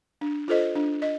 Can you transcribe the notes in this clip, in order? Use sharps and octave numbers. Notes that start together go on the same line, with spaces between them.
D4
F4 A4 C5 D#5
D4
D#5